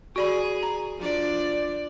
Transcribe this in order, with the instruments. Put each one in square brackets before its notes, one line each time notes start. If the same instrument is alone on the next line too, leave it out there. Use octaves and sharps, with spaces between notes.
[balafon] F#4 D5 B5 [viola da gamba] G#4
[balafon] A#5
[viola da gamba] F3 D4 D5